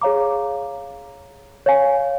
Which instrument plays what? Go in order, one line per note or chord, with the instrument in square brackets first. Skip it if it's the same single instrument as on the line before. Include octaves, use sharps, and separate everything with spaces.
[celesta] G#4 C#5 F5 A#5 D6
C#5 F5 G#5